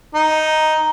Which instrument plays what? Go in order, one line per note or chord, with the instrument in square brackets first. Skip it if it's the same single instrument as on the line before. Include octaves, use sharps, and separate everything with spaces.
[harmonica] D#4